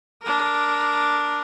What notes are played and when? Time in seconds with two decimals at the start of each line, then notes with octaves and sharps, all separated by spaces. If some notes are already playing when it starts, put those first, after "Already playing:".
0.22 D4 A#4